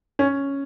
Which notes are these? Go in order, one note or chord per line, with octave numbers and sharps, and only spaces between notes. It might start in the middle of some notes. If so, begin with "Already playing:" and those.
C#4